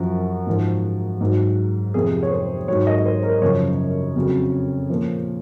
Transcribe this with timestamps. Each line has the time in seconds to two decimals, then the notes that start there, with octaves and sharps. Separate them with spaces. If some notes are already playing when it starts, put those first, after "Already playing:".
Already playing: F#2 F3 F#4
0.47 G#2 F3
1.21 G#2 F#3
1.94 F2 C3 F3 G#4
2.23 C#5
2.31 C5
2.68 G#2 F#3 C#5
2.87 D#5
3.06 C5
3.23 A#4
3.42 F#2 C#3 F3 C#5
4.16 F2 C#3 F#3
4.90 A#2 F3